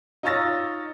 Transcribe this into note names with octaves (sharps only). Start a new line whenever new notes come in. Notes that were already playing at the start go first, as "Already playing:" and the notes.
D#4 F4 C#5 E6 A6 A#6